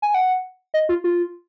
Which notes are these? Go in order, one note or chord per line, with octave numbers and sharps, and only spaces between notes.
G#5
F#5
D#5
F4
F4